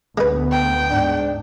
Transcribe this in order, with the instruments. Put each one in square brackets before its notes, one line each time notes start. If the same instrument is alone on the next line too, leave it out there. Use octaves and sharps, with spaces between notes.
[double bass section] D2 B3 [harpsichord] G#3 B4
[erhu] G5
[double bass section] G#2 [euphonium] D4